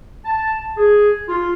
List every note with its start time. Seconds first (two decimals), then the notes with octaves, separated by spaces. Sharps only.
0.25 A5
0.77 G#4
1.28 F4